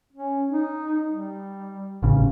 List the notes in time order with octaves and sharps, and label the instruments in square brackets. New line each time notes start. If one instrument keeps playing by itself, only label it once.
[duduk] C#4
D#4
G3
[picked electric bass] A1 C#3